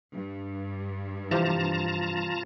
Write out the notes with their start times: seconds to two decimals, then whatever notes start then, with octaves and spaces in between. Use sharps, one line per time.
0.14 G2
1.31 C3 E3 F3 F4 G4 A5 A#5